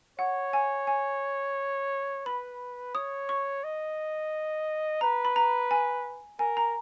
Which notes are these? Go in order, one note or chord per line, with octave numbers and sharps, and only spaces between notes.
C#5 F#5
G#5
G#5
B4 B5
C#5 D#6
C#6
D#5
B4 A#5
B5
A#5
G#5
A#4 G#5
A#5